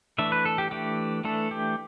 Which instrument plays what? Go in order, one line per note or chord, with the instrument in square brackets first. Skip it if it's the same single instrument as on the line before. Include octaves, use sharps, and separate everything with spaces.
[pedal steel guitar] E3 A3 D4 E5
B4
A4
G4
E3 A3 D4 G4
E3 A3 D4 A4
G4